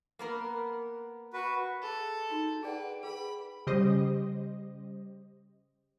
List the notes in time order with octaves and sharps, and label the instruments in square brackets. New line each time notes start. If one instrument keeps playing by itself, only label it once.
[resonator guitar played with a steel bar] A#3 B3 A#4
[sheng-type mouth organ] F#4 B4
[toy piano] G#4 B5 [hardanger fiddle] A4
[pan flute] D#4 [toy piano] F#4
[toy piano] G#4 D5 F#5 [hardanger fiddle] B4 [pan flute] G5
[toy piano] G#4 B4 [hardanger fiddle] B5
[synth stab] C#3 G3 G4 C5 D#5